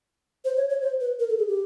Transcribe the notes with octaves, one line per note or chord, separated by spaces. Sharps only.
C5
C#5
C#5
C5
B4
A#4
A4
G#4
G4